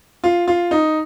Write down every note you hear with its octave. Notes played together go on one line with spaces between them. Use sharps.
F4
F4
D#4